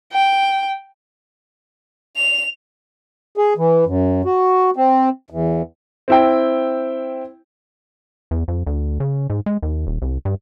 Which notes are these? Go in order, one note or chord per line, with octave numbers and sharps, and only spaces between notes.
G5
F7
G#4
E3
F#2
F#4
C4
E2
C4 E4 G5
E2
F2
D2
C#3
G#2
G#3
D#2
D#1
C2
G2